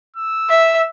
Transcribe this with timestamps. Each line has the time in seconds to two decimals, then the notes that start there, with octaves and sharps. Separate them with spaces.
0.16 E6
0.49 E5